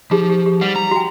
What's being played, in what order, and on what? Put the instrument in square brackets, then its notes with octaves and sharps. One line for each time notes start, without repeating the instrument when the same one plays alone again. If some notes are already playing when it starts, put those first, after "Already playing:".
[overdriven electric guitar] F3 [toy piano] D#4 G4 G#4
[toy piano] G4
G4
[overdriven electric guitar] G3 [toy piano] F#5
[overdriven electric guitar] A#5
[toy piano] F#4 G5